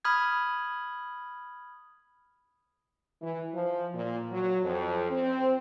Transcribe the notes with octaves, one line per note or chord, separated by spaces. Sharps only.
B5 D#6 F6 G#6
E3
F3
A#2
F#3
F2
C4